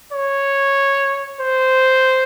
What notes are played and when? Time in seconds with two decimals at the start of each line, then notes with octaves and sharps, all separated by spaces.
0.13 C#5
1.40 C5